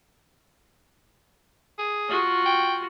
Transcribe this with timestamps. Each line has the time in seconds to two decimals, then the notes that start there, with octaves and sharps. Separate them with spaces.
1.78 G#4
2.09 F4 F#4
2.46 G5